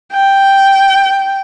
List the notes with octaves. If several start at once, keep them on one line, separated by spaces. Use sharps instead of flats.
G5